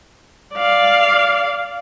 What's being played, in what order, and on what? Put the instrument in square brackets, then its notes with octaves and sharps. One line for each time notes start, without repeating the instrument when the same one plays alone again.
[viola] D5 F5